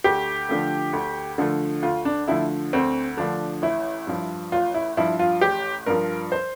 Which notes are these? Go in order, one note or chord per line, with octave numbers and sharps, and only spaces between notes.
D2 G4
D3 F3 A3
D2
D3 F3 A3
D2 F4
D4
D3 F3 A3 E4
D2 C4
D3 F3 A3 D4
A1 E4
G2 F3
A1 F4
E4
G2 F3 E4
F4
A1 G4
G2 F3 A#4
C5